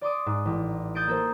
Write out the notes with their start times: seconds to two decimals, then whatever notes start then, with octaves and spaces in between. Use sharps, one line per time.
0.01 D5 C6 D6 D#6
0.26 G#2
0.45 A1
0.95 D#6 G6 A6 C#7 D7
1.07 A#3 A4 C5